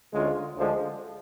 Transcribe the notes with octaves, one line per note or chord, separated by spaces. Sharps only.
D2 D3 G#3 C#4 F4
D2 D3 F3 G#3 D4